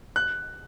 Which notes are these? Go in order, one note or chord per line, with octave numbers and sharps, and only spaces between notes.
F#6